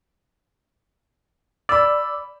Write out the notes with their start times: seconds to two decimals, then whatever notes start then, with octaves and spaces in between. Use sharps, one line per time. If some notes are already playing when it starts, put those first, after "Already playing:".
1.69 D5 B5 E6